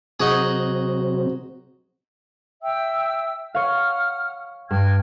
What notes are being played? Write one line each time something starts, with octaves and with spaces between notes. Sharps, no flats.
C3 F#3 C4 D#4 F#4 G#4
E5 G5 E6
C#5 F5 F#5 F6
G2 G5 F6 G#6